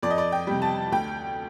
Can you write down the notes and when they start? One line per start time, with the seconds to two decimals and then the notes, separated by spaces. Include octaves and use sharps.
0.02 F2 D5
0.10 D#5
0.18 D5
0.32 G5
0.47 C3 G3
0.62 A5
0.92 D2 G5